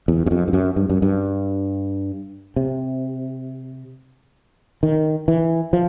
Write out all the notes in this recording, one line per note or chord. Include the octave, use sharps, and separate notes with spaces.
E2
F#2
F2
G2
F#2
G2
F#2
G2
C3
D#3
E3
F3